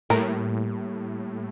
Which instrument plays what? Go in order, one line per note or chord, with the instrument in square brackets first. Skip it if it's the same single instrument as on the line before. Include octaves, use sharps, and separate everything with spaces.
[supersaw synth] A2 [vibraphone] G3 A#3 G4 [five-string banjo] A#4